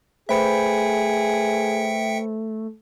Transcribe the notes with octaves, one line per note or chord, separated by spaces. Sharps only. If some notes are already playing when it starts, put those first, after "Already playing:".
A3 G#4 B4 C5 E5 G5 B5 C#7